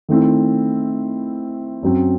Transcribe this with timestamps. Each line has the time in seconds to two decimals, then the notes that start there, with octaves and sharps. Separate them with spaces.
0.09 D#3 A3 C4 E4
1.83 F#2 F#3 C4